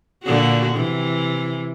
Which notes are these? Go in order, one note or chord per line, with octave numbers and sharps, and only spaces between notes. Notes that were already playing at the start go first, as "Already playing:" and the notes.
A#2 D3 F#4
C3 E3